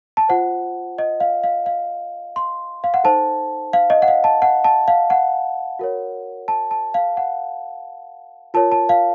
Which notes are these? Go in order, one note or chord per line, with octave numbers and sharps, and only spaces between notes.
A5
F4 C5 F#5
D#5
F5
F5
F5
C6
F5
F#5
D#4 A4 C5 A5
F5
D#5
F#5
F5
A5
F#5
A5
F5
F#5
F#4 A#4 C#5
A5
A5
F5
F#5
F4 A#4 C#5 A5
A5
F5